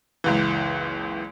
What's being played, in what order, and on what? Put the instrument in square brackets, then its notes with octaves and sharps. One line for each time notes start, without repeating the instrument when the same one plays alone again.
[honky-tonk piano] F#1 C#2 E3